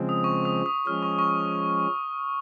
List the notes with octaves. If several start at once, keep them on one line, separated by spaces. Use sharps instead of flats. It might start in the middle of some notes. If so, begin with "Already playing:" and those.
Already playing: C#3 F3 G#3 C4
D#6
C#6
D#6
D#6
F3 G#3 C#4 F6
C#6
C#6